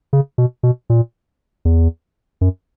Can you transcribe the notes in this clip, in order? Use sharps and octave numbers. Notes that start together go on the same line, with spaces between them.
C#3
B2
B2
A#2
E2
F#2